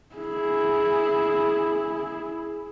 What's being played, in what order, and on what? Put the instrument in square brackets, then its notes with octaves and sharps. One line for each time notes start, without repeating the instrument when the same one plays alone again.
[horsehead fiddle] E4 G#4